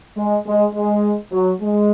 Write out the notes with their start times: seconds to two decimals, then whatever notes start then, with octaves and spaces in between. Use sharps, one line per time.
0.17 G#3
0.46 G#3
0.74 G#3
1.32 F#3
1.61 G#3